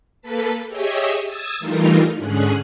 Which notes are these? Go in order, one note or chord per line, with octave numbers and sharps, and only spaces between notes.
A#3 A4 B4 A5 B6
G4 G#4 C#5 D#5 E5 E6
D#6 E6 G#6 A6
E3 G3 A3 D#4 F4 A#4
G#2 D3 C#4 G#4 F#6